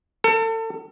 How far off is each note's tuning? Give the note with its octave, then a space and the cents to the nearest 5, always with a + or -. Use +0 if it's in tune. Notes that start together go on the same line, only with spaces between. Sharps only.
A4 +35